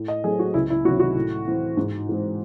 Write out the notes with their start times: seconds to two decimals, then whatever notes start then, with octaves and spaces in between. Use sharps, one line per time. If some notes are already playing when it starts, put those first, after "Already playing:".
Already playing: A2
0.08 D#5
0.24 F#3 A3 C4 G#4
0.39 F#4
0.54 C#2 E4
0.70 E4
0.84 C3 D#3 F#3 C#4 F#4
1.00 F#4
1.16 A2
1.46 E3 C4
1.77 G#2
2.07 E3 G#3 C4